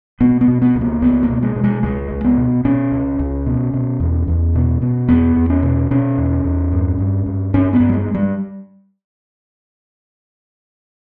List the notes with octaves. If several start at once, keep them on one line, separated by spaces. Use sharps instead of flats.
B2 B3
B3
B2
B3
C#2
A#3
C#2 B3
A#3
B2
G#3
B2
G#3
C#2 G#3
C#2
B3
B2
B2 C#4
C#2
C#2
B2
B2
E2
E2
B2
B2
E2 B3
E2
C#4
B2
B2 C#4
E2
E2
G2
G2
G2
G2 C#4
B3
G2
G3
G#3
G2
G3